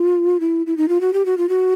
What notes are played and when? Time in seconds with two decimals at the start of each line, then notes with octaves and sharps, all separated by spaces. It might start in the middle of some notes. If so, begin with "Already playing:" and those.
Already playing: F4
0.40 E4
0.67 E4
0.77 D#4
0.89 F4
1.01 F#4
1.13 G4
1.26 F#4
1.38 F4
1.49 F#4